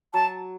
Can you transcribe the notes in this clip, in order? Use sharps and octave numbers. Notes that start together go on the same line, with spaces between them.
F#3 A5